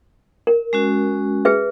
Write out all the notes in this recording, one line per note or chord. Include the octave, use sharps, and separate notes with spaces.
A#4
G#3 C#4 F#4
G#4 B4 E5